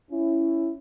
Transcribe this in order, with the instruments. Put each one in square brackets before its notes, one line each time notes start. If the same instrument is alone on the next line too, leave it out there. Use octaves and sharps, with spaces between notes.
[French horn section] C#4 E4